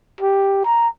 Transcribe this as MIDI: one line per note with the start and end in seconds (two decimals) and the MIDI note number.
0.21 0.62 67
0.65 0.88 82